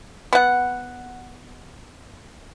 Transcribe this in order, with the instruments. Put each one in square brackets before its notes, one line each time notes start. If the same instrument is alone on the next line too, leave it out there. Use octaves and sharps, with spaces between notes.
[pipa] B3 F#5